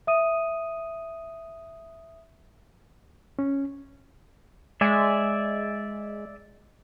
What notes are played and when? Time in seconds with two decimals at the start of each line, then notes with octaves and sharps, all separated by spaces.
0.07 E5 D#6 D#7
3.39 C#4
4.81 G#3 D5 E5 G#5